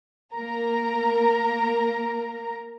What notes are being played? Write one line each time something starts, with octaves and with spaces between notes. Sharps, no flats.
A#3 A#4 A#5